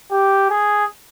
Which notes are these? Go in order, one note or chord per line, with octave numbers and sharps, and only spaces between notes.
G4
G#4